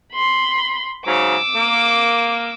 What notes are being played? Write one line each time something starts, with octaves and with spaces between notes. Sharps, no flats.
B5 C6
G#2 C#3 F#3 D6 E6
A#3